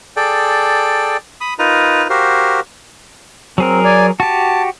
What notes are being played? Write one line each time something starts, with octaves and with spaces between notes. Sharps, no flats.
G#4 A4 D5 G5
B5 D#6
D#4 F4 A#4 B4 A#5
F#4 G4 A#4 C5 F5
F#3 C4 G#4 A#4
D5 G#5
F#4 G4 A5